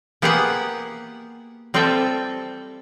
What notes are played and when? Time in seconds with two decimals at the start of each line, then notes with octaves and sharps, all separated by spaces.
0.22 A#3 B3 G4 G#4 E5 F#5
1.74 G3 C4 F4 A4 E5 G5